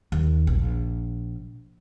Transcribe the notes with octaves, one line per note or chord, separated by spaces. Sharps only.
D#2
A#1